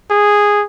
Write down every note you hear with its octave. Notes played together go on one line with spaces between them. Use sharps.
G#4